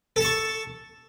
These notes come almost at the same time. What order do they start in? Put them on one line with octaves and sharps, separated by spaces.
A4 A5 C#6